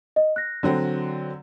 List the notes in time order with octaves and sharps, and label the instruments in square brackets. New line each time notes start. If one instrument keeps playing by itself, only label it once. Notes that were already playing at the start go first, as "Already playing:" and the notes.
[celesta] D#5
F#6 A#6
[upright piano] D3 F#3 C4